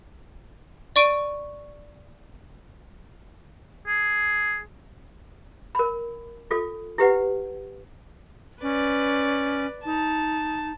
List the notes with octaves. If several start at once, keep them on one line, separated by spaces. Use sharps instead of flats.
D5 C#6 D7 D#7
G#4
A#4 B5
F4 A4
E4 G4 B4 F#5
C#4 B4 D5
D#4 A5